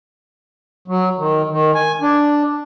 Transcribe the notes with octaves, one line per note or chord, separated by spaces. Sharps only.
F#3
D#3
D#3
G#5
D4